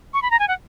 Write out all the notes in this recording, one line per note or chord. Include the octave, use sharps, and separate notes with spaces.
C#6
B5
A#5
G#5
F#5